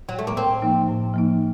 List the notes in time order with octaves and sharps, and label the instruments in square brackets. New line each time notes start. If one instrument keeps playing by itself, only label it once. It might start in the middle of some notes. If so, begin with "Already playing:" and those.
[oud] F#3
A3
A#3
[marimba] A2 [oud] C4
[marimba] F3 A#3 D#4
A2
F3 A#3 D#4